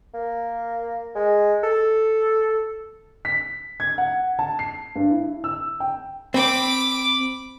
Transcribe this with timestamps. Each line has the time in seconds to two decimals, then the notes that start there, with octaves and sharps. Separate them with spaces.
0.14 A#3
1.15 G#3
1.63 A4
3.25 B6
3.80 G#6
3.98 F#5
4.39 A5
4.59 C7
4.96 G2
5.10 E4
5.44 E6
5.80 G5
6.34 C4 B5 D6